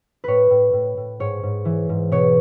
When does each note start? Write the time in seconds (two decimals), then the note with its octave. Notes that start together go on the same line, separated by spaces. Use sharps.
0.24 A2 B4 C#5
0.50 A2
0.73 A2
0.97 A2
1.20 G#2 C#5
1.43 G#2
1.65 E3
1.89 G#2
2.12 B2 C#5